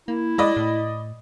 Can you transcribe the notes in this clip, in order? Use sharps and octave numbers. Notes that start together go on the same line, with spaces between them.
A#3 E4
G#3 D5 D#5 B5
A2